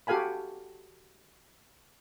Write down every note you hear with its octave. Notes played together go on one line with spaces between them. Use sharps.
F#4 G4 A4 F5 G#5 B5